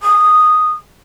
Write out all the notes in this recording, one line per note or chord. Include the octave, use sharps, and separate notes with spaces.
D#6